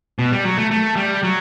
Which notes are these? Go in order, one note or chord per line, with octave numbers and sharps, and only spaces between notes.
B2
G3
F#3
A3
A3
G3
F#3